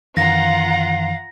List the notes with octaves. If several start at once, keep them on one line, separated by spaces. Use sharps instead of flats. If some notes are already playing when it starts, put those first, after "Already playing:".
F#2 D#3 E3 F4 F5 F#5 A#5 A#6